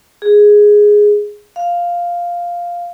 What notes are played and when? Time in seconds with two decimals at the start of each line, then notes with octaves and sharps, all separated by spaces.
0.22 G#4
1.56 F5